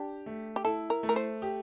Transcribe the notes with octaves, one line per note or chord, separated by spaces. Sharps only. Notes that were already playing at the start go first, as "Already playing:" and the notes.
Already playing: D4 G4
A3
G4
E4 A4
A#4
A3
A#4
C5
G4